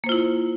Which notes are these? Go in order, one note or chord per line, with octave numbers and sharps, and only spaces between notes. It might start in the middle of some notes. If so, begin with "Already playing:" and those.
A#3 E4 F4 C5